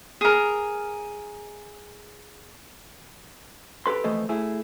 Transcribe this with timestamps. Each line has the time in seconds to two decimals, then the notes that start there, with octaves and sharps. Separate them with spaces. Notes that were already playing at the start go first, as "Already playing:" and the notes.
0.21 G#4 A#4
3.86 G4 A4 B4 C6
4.04 F2 E3 A3 A4 C5 D#5
4.29 A3 E4 G#4